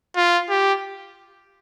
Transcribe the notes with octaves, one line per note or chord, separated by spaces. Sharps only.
F4
G4